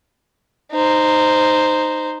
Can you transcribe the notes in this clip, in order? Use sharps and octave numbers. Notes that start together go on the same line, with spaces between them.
D#4 C5